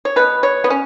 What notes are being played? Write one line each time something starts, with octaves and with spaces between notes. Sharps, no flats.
C#5
B2 B3 B4
C#5
B3
C#4